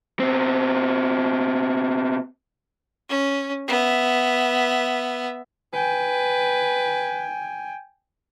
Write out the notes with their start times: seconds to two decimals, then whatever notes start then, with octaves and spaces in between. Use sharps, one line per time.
0.20 B2 C4
3.09 C#4
3.68 B3 E5
5.74 B4 G5 G#5